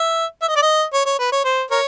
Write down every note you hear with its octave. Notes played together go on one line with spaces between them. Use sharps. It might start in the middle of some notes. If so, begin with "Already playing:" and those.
Already playing: E5
E5
D#5
D5
D#5
C#5
C#5
B4
C#5
C5
A#4 C#5